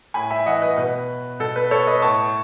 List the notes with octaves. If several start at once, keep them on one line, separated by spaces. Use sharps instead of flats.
A2 G#5 B5
E5 G#5
E3 D#5 F#5
B4 D#5
B2 B4
B2 A4
B4
A4 C#5
B4 D#5
A2 A5 C#6